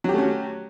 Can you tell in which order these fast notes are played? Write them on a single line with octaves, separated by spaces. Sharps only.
F#3 G4 A3 C#4 F#4